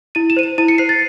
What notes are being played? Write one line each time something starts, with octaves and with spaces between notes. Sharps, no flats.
E4 D#7
E7
C5 D#7
E7
E4 D#7
C#7
C5 C7
A6